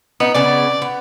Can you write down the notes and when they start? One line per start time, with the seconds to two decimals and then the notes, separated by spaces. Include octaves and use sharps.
0.20 B3 D#4
0.35 C#3 B3 D5 G#5
0.82 B3